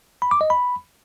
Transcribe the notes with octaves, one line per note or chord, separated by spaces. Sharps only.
B5
D6
D#5
B5